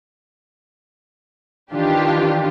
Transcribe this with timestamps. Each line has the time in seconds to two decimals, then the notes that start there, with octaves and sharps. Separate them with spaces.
1.73 D#3 E3 D4 F4 G4